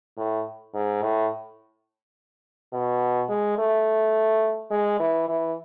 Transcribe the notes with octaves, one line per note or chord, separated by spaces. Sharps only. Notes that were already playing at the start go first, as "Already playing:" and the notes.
A2
G#2
A2
B2
G#3
A3
G#3
E3
E3